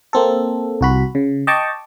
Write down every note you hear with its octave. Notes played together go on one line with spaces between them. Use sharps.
A#3 C4 A4
C2 F#4 B5
C#3
D#5 G5 A5 C#6 D6